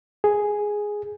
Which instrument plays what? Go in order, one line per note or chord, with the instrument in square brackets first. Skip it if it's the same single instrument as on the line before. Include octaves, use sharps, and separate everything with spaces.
[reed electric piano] G#4